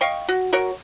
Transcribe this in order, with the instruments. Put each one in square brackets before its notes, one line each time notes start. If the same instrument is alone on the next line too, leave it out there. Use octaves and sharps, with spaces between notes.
[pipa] D#5 F5 G5 C#6
F#4
F#4 A#4 C#5